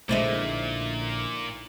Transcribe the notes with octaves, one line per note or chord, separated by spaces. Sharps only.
A#1 A#2 D3 G#3 A3 D#4 E4 C5